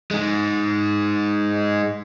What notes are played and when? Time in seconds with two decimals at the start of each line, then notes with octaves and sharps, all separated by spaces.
0.11 G#3 D#4